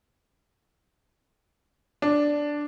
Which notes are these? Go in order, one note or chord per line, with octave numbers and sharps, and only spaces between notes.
D4